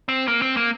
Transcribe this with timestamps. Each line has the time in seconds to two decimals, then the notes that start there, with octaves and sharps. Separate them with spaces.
0.09 C4
0.28 A#3
0.42 C4
0.57 A#3